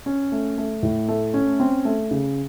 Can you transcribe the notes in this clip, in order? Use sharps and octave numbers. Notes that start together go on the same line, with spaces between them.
C#4
A3
A3
A2
A3
C#4
C4
A3
C#3